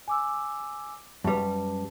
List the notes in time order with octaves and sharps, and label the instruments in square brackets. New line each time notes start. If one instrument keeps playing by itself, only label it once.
[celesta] G#5 D6 E6
[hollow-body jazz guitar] F#2 G3 [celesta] B4 A5